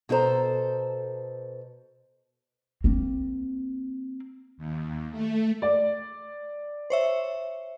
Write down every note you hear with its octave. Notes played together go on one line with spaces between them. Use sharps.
B2 D#4 A4 C5 A#5
A#3 C4
D#2
A3
D5
C5 C#5 E5